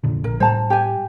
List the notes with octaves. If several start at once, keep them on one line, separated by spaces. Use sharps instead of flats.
F1 A#2 D3
A#1 A#4
A2 G3 C5 A5 A#5
G4 G#5